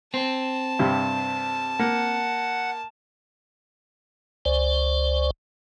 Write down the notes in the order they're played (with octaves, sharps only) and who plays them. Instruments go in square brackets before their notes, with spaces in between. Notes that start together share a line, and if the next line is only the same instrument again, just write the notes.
[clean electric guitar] C4 [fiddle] A5
[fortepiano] G2 C3
[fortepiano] A#3 [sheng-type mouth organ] F#5
[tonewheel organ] C#2 C5 D5